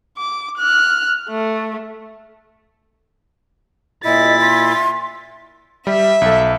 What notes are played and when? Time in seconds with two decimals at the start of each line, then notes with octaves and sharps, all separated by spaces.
0.17 D6
0.58 F6 F#6
1.30 A3
4.05 A#2 E4 D#5 A6 B6
4.40 C6
5.87 G3 E5
6.22 B1 A4